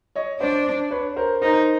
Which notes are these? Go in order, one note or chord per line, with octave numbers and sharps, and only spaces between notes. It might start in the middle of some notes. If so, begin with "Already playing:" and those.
C#5 D#5
D4 C5 D5
B4 C#5
A#4 C5
D#4 A#4 C5